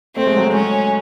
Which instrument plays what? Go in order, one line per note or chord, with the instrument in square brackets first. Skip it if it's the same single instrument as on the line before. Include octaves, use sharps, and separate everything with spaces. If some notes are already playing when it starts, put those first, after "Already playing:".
[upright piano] A3 [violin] C4
[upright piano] G#3
F#3
G#3
[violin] C#4